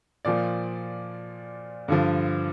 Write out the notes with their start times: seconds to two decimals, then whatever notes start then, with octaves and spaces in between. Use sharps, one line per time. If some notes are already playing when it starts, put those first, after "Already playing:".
0.25 A#2 F3 D5
1.88 G2 D3 F3